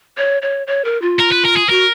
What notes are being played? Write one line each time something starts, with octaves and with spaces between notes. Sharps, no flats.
C#5
C#5
C#5
A#4
F4
A#4
B4
A#4
G#4
F#4 A#4